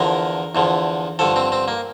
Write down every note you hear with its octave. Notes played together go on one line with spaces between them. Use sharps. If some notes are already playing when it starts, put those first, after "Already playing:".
Already playing: E2 D3 F3 A#4
E2 D3 F3
G2 D3 F3 A4
C4
C4
A#3